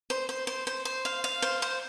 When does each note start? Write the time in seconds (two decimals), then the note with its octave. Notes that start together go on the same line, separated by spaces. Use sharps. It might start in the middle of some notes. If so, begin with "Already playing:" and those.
0.10 C5
0.29 C5
0.47 C5
0.67 C5
0.85 C5
1.05 F5
1.24 F5
1.42 C5
1.62 C5